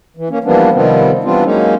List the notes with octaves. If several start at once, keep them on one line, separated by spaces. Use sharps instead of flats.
E3
A#3 C#4
E3 F3 G3 A#3 B3 D4
C3 D#3 F3 G3 B3 C4
E3 G3 B3 C4 D4 F4
F#3 G#3 A#3 C#4 D#4